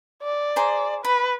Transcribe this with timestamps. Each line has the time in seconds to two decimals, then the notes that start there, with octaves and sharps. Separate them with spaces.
0.22 D5
0.56 G#4 C5 A#5
1.05 B4 B5